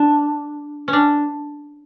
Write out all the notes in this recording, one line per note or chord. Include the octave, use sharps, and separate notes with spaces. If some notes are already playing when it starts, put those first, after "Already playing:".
Already playing: D4
C#4
D4